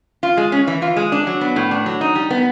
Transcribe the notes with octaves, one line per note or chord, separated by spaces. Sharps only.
F4
G#3
C#4
E3
F4
G#3
D4
F#3
B3
A2
D4
F#3
D#4
G3
B3